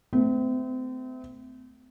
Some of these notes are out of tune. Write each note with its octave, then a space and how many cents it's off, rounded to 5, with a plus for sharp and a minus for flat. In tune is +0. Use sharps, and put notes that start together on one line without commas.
A3 +0 C4 -35